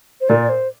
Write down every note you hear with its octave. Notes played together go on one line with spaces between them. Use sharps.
C5
A#2 D5
C5